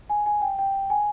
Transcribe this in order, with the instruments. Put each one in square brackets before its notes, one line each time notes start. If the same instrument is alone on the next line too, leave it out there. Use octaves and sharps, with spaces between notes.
[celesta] G#5
G#5
G5
G5
G#5